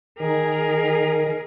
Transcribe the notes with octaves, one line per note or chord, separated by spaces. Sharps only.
D#3 G#4 A#4